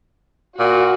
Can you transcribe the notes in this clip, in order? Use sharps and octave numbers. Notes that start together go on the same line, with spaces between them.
A#2 F#4